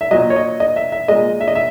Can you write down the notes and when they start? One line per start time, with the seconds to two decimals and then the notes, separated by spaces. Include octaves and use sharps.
0.01 E5
0.11 A#2 F#3 D#5
0.30 C#5
0.36 D#5
0.60 D#5
0.76 E5
0.92 E5
1.08 A#2 G#3 D#5
1.41 E5
1.48 D#5
1.55 E5